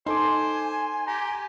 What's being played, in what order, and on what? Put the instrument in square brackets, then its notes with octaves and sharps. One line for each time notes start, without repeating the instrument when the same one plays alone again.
[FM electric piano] D#4 A4 D6 [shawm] C5 [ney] G#5 [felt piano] C6
[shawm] G4 [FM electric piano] A#5